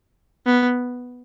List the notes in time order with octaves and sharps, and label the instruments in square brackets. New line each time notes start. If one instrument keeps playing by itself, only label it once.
[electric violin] B3